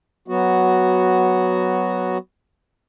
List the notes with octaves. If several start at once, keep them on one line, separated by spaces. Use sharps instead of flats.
F#3 B3 F#4